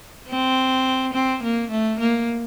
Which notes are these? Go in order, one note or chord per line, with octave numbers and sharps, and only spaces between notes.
C4
C4
A#3
A3
A#3